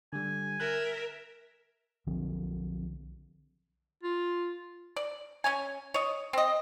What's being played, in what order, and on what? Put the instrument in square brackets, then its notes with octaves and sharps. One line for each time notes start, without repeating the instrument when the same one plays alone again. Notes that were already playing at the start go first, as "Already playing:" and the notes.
[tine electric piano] D3 G3 [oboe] G#5
[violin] A#4 E5 [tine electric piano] F#6
[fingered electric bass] B1 D3 F3 C4
[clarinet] F4
[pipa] D5
C#4 C#5 G#5
C#5 D#5
C4 D#5